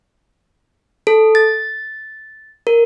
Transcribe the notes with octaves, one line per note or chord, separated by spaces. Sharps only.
A4
A6
A#4